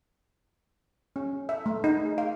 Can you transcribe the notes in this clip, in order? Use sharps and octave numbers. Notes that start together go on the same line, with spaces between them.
C#4
E5
A3
D#4
G#4
F5